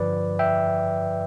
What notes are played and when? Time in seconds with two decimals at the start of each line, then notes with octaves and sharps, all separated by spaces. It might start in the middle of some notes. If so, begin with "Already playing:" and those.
Already playing: G2 D3 F3 B4 D5
0.39 E5 G5